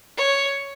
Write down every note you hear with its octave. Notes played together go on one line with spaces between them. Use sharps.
C#5